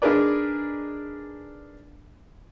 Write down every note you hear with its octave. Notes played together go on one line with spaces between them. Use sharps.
D4 D#4 G#4 A#4 B4 D5